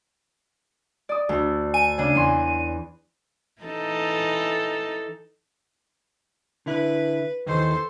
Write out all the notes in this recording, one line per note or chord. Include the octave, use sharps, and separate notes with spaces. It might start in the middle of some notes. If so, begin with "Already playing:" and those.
D5 D#6
D2
G#5 D#7
C#3 D4
E2 C6
E3 D#4 A4
D3 E4 B4
D#2 D#3 E3 A4 C5